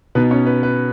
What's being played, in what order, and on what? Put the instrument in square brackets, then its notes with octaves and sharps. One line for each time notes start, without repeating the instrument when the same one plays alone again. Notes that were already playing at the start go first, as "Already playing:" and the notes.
[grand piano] B2 B3 D#4 B4
C#4 C#5
B4
B4